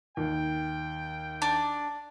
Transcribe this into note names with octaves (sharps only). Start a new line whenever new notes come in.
D#2 G5
D4